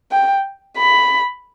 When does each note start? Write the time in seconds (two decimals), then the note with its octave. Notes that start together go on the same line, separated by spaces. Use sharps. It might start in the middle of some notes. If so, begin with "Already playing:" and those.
0.12 G5
0.78 B5